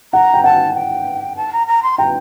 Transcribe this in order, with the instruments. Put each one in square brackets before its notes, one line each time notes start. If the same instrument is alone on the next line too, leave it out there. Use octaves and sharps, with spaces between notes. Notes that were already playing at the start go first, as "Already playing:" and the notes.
[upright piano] F#5 [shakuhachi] A#5
[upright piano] G5
[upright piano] F#5 [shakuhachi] A5
[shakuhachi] G5
A5
A#5
A#5
C6
[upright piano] G5 [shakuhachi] A#5